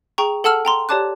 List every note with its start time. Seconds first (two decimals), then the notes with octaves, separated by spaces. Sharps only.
0.18 G#4 G5 A#5 C#6
0.44 A4 F#5 A5 E6 F6 F#7
0.65 G5 A#5 C6
0.89 G4 C#5 D5 A5 D6 F#6